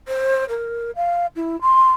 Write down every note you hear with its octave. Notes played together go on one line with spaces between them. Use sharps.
C5
A#4
F5
E4
C6